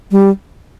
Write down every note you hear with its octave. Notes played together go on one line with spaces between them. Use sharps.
G3